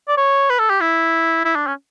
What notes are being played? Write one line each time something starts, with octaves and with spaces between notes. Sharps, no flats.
D5
C#5
B4
A4
G4
E4
E4
D4
C#4